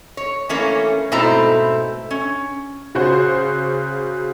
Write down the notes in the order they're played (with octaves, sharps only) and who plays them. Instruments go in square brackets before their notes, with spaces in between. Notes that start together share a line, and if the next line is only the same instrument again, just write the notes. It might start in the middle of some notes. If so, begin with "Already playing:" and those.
[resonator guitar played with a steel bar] C#5
E3 A3 A#3 C#4
G#2 B2 A3 C4 E4 A#5
C#4
[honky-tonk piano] C#3 F#4 C5